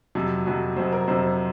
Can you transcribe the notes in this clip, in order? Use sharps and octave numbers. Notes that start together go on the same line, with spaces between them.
F2 C3 F#3
F2 C3 F#3 F#4
F2 C3 F#3 C5
A#4
F2 C3 F#3 C5